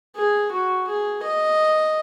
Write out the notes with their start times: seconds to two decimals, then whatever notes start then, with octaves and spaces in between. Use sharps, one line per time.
0.16 G#4
0.52 F#4
0.88 G#4
1.23 D#5